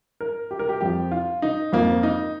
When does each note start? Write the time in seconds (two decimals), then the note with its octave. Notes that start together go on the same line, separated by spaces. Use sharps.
0.21 A#4
0.51 G4
0.59 A#4
0.69 G4
0.81 F2 F3 G4
1.11 F4
1.42 D#4
1.72 F2 F3 A#3
2.03 D#4